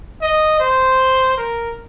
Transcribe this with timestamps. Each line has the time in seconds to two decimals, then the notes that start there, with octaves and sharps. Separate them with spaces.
0.22 D#5
0.60 C5
1.37 A#4